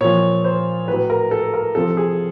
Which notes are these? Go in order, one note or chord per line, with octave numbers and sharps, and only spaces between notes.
A#2 F3 C#5
C5
A2 F#3 B4
A#4
A4
A#4
C3 F3 A4
G#4